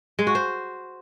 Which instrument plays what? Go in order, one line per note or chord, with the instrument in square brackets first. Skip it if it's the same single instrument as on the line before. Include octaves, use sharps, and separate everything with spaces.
[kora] G#3
F#4
C5